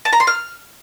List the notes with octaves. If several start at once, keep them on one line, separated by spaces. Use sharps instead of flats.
A5
A#5
C6
F6